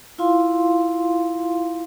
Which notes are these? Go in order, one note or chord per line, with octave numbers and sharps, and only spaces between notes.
E4 F4 F5 C6